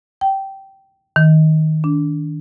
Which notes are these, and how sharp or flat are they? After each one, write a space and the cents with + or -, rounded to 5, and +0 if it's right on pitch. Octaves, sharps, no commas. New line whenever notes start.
G5 -15
D#3 +10
D4 -25